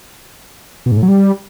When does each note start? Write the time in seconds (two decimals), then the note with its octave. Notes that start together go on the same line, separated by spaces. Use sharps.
0.86 B2
0.92 G#2
0.97 A2
1.03 F#3
1.08 G3